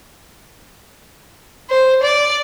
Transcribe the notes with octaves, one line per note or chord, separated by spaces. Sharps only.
C5
D5